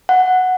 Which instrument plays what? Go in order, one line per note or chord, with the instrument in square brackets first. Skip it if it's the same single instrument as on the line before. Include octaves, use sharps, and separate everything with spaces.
[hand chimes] F#5